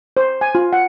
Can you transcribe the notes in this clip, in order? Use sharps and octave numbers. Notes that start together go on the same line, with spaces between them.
C5
G#5
F4
F#5